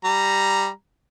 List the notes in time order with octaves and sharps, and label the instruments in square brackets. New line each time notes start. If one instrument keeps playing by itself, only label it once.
[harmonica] G3 A#5